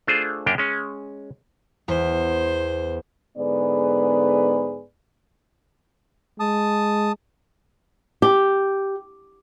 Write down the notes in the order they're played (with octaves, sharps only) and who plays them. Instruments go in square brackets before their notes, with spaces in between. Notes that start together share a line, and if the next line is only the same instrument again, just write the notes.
[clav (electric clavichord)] A3 D4 F4 G#4 C5
F#2 A#3 D4 G4 G5
G#3 C#4
[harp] E2 [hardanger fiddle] C5
[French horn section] G#2 D3 B3 G#4 B4 D5
[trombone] G#3 [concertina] A5 D#6
[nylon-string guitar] G4